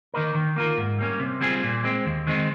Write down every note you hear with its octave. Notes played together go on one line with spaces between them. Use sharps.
D#3 A#3 D#4 A#4
D#3
A#3 F4 A#4
G#2
G3 A#3 C#4
C3
G3 C4 F4 G#4
A#2
G#3 C4
D#2
D#3 G#3 C4 D#4